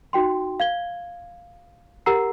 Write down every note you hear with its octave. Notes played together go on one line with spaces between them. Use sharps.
D#4 F#4 G5 C6
F5 G#6 G7
G4 A#4 F#5 A#5 E6 C7